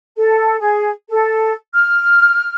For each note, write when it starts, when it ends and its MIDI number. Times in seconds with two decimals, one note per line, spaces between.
0.17 0.58 69
0.59 0.90 68
1.09 1.53 69
1.74 2.55 89